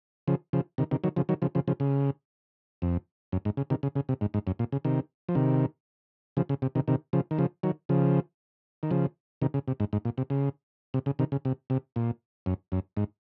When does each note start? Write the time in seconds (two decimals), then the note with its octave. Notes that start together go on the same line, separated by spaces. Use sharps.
0.28 C#3 F3
0.53 C#3 F3
0.78 C3 D#3
0.91 C3 D#3
1.04 D#3 F#3
1.16 C#3 F3
1.29 D#3 F#3
1.42 C#3 F3
1.55 C#3 F3
1.68 C#3 F3
1.80 C#3
2.82 F2
3.32 F#2
3.45 G#2
3.57 C#3
3.70 C3 D#3
3.83 C#3
3.95 C#3
4.09 C3
4.21 G#2
4.34 G#2
4.47 F#2
4.59 A#2
4.72 C#3
4.85 C3 D#3
5.29 F3
5.35 C3 D#3
6.37 C#3 F3
6.49 C#3
6.62 C3
6.75 C3 D#3
6.88 C3 D#3
7.13 C#3 F3
7.31 D#3
7.38 C#3 F3
7.63 D#3 F#3
7.89 C#3 F3
8.83 D#3
8.91 C#3 F3
9.42 C3 D#3
9.54 C#3
9.68 C3
9.80 G#2
9.93 G#2
10.05 A#2
10.18 C3
10.30 C#3
10.94 C3
11.06 C#3
11.19 C3 D#3
11.32 C#3
11.45 C3
11.70 C3
11.96 A#2
12.46 F#2
12.72 F#2
12.97 G#2